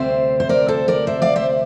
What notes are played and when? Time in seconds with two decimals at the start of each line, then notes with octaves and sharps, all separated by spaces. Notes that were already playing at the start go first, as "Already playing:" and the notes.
Already playing: D2 C3 G3 C4 C5 E5
0.40 C5
0.49 A#4 D5
0.68 A4 C5
0.88 A#4 D5
1.07 C5 E5
1.22 D5 F5
1.36 C5 E5